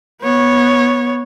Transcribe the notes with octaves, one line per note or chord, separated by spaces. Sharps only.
B3 C#5